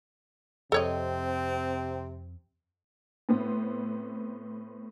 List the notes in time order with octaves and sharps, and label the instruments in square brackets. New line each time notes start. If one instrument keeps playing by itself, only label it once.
[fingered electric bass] F2 [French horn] C3 [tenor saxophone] C4 [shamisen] A4 C#5 D#5
[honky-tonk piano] A2 B3 C4